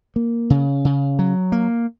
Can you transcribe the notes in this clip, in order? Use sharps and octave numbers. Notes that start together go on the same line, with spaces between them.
A#3
C#3
C#3
F#3
A#3